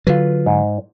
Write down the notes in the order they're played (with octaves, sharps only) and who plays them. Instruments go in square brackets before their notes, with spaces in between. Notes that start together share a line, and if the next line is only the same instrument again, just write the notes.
[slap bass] D3 F#3 [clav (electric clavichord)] F4 B4
[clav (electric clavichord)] G#2